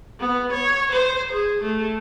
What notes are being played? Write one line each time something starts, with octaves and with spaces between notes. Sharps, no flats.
B3
C#5
C5
G#4
A3